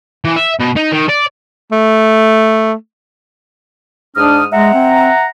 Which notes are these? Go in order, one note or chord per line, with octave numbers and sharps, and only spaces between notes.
E3
E5
B2
D#4
D#3
D5
A3
G#2 D4 D#6 F6
G#3 E5 F#5 A#5
C4